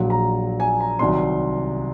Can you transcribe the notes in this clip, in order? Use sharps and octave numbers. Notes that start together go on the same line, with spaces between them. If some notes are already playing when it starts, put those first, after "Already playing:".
Already playing: A#1 A#2 F#3
A#5
G#5
A#5
C2 C3 D#3 F#3 C6